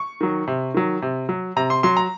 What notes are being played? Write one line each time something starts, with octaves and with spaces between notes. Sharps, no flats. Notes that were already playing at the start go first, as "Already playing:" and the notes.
Already playing: C#6
D#3 F#3
C3
D#3 F#3
C3
F#3
C3 A#5
C6
F#3 C6
A#5